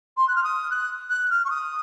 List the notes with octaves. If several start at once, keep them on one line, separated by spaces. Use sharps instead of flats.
C6
F#6
F6
D#6
F#6
F#6
F6
C#6
D#6